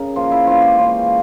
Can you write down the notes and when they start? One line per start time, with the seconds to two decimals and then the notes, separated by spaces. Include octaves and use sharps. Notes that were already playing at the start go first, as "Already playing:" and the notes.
Already playing: C#3 A#4
0.16 F3 A#3 C#4 F4
0.32 E4
0.47 E3 G#3 C4 F4
0.62 G4
0.78 E3 G#3 C#4 F4